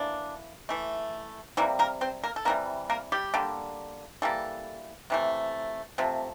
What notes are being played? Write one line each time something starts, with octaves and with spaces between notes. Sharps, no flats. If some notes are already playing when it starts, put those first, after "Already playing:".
Already playing: E3 A#3 D4
E3 A3
C3 E3 G3 A#3 E4
A#3 A#4
C4 C5
A#3 A#4
A4
C3 E3 G3 A#3 A#4
A#3 A#4
G3 G4
D3 G3 A#3
E3 G3 A3 A#3 A4
C3 E3 A3
C3 F3 A3